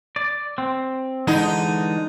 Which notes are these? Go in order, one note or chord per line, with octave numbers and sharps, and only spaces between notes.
D5
C4
D3 E3 G#3 D#4